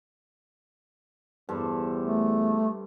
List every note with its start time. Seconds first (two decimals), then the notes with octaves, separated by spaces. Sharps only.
1.49 E2 G2 A4 C5
2.03 A3